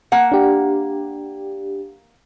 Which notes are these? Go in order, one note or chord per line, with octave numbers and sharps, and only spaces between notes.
A#3 F#5
D4 G4